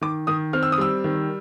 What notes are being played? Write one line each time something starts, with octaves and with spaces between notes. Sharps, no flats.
D#3 D6
D#3 D#6
C4 F6
E6
D#6
G3 E6
D#3